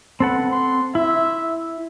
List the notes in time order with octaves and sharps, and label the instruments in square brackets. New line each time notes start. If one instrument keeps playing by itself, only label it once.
[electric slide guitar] C4 A4 F#5 [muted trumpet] B4
[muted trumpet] C6
[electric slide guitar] E4 [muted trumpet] E5